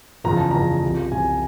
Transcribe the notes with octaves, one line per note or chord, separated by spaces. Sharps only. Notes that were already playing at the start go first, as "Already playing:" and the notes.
F#1 E2 C#3 F3 A#5
A5
F#1 E2 C#3 F3 A#5
C2 C3 F3
C2 C3 F3 G#5